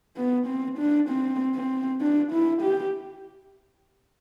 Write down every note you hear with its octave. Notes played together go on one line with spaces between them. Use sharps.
B3
C4
D4
C4
C4
D4
E4
G4